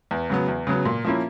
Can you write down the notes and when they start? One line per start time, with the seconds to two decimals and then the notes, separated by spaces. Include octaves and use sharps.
0.11 E2
0.30 C#3 F#3 B3
0.48 E2
0.67 C#3 F#3 B3
0.85 A#2
1.05 F3 A#3 C#4 E4